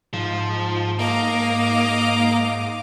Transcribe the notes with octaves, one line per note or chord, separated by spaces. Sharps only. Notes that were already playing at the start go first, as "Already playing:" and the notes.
G#2 F3
A#3 D#5 F5 D6